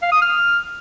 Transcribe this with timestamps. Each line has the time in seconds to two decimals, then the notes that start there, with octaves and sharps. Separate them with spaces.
0.02 F5
0.12 D#6
0.21 F6